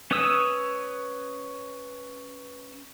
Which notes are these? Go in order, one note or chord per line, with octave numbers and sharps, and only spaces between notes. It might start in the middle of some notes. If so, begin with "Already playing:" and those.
C#4 B4 C#5 D#6 E6